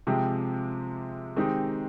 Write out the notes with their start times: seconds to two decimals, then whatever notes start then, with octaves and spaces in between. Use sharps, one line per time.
0.07 C3 F3 G#3 C4 G4
1.36 D#3 G#3 C4 D#4 G4